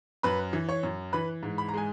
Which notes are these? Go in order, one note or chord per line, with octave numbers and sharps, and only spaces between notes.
F#2 B4 B5
E3
C#5 C#6
F#2
E3 B4 B5
G#2
B5
A#5
G#3 G#5